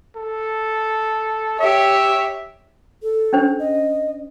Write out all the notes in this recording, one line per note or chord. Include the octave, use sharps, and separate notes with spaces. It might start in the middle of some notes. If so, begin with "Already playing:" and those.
A4
G4 C#5 E5
A4
C#4 D4 C5
D#5